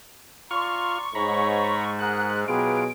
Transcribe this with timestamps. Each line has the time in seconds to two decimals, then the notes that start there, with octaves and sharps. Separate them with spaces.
0.51 F4 D5 A#5 C6 C#6 F6
1.15 G#2 C#5 A#5 B5
1.99 G#4 A#4 F#5 F#6
2.48 B2 F#3 C4 F4 G4 G#4 B4 D7